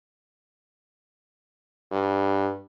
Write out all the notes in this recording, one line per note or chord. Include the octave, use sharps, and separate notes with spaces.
G2